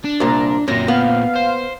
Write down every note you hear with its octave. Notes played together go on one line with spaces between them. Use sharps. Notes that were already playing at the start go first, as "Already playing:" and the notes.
D4
C2 A#2 A#5
F#2 A#2 C4 A#6
B3 F5
C5